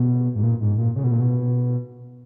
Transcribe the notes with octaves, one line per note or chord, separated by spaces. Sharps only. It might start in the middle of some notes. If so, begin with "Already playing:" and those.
Already playing: B2
G#2
A#2
G#2
A#2
C#3
B2
A#2
B2